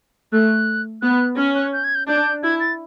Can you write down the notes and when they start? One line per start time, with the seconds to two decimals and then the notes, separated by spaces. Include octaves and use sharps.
0.32 A3 F#6
1.02 B3 F#6
1.37 C#4 F6
1.55 F#6
1.73 G6
1.84 G#6
1.95 G6
2.08 D4 G6
2.43 E4 G#6
2.60 A6